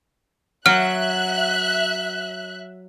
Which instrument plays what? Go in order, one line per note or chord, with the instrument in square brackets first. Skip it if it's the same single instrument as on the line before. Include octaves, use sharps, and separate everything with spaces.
[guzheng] F#3 [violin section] E5 F#6 [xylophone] F6